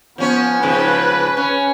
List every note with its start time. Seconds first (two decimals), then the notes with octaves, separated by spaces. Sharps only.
0.18 F3 B3 C#4 C#5
0.63 G#2 C#3 F3 B4
1.37 C#4